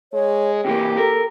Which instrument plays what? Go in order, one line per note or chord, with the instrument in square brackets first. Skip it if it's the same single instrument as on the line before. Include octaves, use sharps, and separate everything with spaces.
[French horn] G#3 [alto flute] C#5
[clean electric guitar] C3 E3 A#3 [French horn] G4 [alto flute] G5
[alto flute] A4 [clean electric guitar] A#4